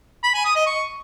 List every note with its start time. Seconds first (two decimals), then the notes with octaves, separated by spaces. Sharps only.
0.24 B5
0.34 G#5
0.45 D#6
0.56 D#5
0.66 C#6